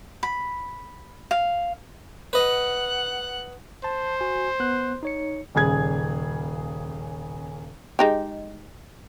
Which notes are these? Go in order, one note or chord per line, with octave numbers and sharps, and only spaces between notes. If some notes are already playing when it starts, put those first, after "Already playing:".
B5
F5
B4 D#5 F#5 F#6
C5 A5
F#4 G#5
B3 F#6
D#4 C#5 C#7
D#1 C#3 G#4 G#6
G#3 D#4 G4